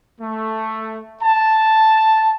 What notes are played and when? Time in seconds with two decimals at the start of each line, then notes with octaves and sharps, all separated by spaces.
0.21 A3
1.23 A5